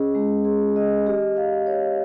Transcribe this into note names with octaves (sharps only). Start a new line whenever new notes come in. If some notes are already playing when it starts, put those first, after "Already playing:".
Already playing: C#4 G#4 D#5
G#3
G#4
D#5
G4
F5
C#5